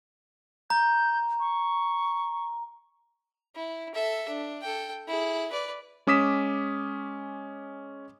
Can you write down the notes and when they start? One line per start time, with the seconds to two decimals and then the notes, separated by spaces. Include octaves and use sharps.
0.70 A#5 G6
1.40 C#6
3.55 E4
3.95 A4 E5
4.28 D4
4.62 A4 G5
5.08 E4 G#4
5.51 B4 D5
6.07 G#3 C#4 D6 D#6 B6 E7